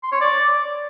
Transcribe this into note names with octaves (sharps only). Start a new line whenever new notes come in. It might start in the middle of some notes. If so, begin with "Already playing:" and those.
C6
C#5
D5